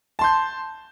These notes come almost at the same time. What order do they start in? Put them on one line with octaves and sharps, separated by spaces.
A5 C6 G6